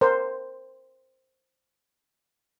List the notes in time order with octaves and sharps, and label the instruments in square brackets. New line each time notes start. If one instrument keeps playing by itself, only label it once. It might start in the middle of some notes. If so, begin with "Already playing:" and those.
[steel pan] A#4 C5